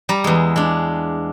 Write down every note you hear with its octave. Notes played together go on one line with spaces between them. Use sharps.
G3 A#5
E2 G#3
G#3 D4